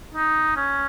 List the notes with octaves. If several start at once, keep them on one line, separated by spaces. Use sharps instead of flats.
D#4
C#4